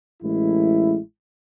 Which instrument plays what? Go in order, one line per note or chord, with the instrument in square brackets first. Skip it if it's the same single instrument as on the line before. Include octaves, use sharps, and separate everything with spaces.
[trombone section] A1 G#3 E4